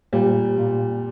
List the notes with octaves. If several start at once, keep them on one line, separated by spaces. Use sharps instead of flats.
A#2 G3
A#2